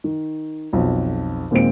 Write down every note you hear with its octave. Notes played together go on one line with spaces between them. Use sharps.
D#3
B1 F2
D#2 A#2 G#3 C4 D7